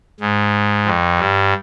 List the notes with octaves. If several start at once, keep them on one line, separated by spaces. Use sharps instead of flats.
G#2
F2
G2